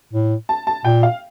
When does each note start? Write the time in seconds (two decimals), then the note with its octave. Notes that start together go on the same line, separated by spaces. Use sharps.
0.13 A2
0.49 A5
0.67 A5
0.85 A#2 G5
1.03 F5